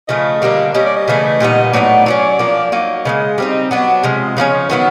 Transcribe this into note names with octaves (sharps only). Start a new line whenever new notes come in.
C#3 F3 A3 D#5
D3 G3 A#3 D4
G3 A#3 C#4 D#5
D5
D#5
C#3 E3 A3
A#2 G3 B3 D#4
A2 F#3 B3 D#4 D5
F#3 A3 C#4
F3 A#3 D4
F#3 A#3 D#4
C#3 E3 G#3 D#5
G3 C4 D#4
F#3 B3 D4 D#5
C3 F3 G#3
C#3 F3 A3 C#4
D#3 F#3 B3 E4